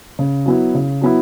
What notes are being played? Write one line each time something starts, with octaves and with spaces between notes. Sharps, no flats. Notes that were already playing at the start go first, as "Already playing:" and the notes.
C#3
F#3 B3 E4
C#3
F#3 B3 E4